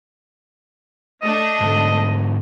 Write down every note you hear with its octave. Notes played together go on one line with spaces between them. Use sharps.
A3 D4 D#5
G#2 D3